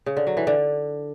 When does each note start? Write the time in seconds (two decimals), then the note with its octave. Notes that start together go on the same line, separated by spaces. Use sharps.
0.06 C#3
0.17 D3
0.27 F#3
0.37 E3
0.47 D3